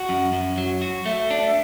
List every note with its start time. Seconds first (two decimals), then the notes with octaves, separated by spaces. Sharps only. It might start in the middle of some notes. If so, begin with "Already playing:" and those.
Already playing: F#4 F#5
0.09 F#2
0.33 F#2
0.58 F#3
0.82 F#4
1.06 A3 E5
1.31 D4